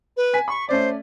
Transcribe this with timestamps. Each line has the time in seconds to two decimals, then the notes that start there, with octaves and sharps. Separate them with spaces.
0.16 B4
0.34 G#5 B6
0.48 B5 C#6
0.69 A3 C#4 C5 D5